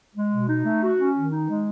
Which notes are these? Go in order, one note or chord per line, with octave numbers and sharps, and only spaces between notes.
G#3
B2
D#4
A3
F#4
C#4
D#3
D#4
G#3